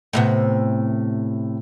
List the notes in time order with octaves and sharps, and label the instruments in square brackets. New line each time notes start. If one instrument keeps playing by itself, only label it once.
[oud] A2 C3 B3